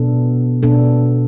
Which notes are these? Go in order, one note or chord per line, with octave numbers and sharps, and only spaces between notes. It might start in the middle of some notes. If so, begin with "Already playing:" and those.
Already playing: B2 B3 D4 A4
B2 B3 D4 A4